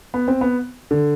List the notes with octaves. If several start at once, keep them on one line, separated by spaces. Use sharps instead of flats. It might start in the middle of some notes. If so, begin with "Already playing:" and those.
B3
C4
B3
D3